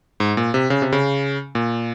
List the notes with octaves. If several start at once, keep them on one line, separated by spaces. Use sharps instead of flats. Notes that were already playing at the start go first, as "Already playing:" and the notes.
G#2
A#2
C3
C#3
C3
C#3
A#2